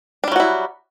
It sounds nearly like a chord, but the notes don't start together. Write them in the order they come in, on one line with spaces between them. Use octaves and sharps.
D4 G3 F#3 F#4 E4